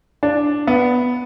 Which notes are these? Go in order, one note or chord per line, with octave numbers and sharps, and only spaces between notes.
D4
B3